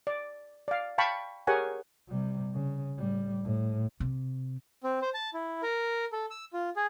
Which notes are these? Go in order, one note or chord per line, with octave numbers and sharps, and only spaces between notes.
D5
D5 F5
F5 G5 A5 B5 C#6
G4 G#4 A#4 C#5 F#5 G#5
C3 G3
C#3
A2 G3
A2
C3
C4
C5
A5
E4
A#4
A4
E6
F4
G#4